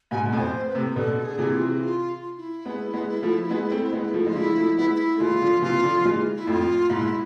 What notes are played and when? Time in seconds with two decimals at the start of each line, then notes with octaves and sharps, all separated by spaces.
0.11 G#2 B2 G#5
0.26 B2
0.30 F2 A2 G#5
0.39 C5
0.68 B4
0.75 A2 C3
0.96 B2 D3 A4
1.24 G#4
1.31 D3
1.38 C3 E3
1.53 F4
1.70 G#4
1.81 F4
2.37 E4
2.65 G#3 B3
2.94 G#3 B3
3.22 F3 A3
3.50 G#3 B3
3.71 A3 C4
3.93 G#3 B3
4.14 F3 A3
4.26 G#3 F4
4.35 D3 F3 E4
4.57 F3 A3
4.77 G#3 B3 E4
4.95 E4
5.16 A3
5.20 E3 G#3 F4
5.42 D3 F3
5.62 C3 E3 F4
5.83 D3 F3
6.05 E3 G#3
6.36 E4
6.47 F2 A2 F4
6.90 G#2 B2 E4